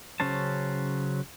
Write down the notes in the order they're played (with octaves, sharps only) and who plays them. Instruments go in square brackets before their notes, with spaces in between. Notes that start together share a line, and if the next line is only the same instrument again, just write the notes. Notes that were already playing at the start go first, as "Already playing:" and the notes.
[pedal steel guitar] C#3 F#3 C#4 C5 A5